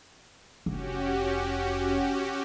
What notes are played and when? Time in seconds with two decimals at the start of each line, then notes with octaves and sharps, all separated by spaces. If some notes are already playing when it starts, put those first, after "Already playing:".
0.66 F1 C#4 F#4 G4